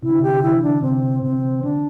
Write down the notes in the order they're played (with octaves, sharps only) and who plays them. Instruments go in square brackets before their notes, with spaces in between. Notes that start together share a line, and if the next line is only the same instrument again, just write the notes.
[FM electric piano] C3 [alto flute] E4
[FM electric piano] D3
C3
[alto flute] G4
[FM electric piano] D3
[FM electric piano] E3 [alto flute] E4
[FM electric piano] D3
[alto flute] D4
[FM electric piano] C3 [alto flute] C4
[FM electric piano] C3 [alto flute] C4
[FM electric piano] D3 [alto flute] D4